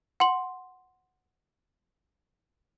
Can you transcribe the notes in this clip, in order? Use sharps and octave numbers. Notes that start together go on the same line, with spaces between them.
F#5 C6 F#7